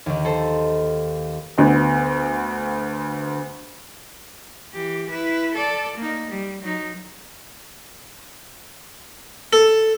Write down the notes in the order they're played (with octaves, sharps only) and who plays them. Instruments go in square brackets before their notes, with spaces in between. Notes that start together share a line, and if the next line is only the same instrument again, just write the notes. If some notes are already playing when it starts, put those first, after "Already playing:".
[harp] D#2 D#3
A4 C5
[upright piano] D2 D3 B3
[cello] E3 G4
E4 B4
A4 D5
A#3 D#4
G3
F#3 D#4
[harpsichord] A4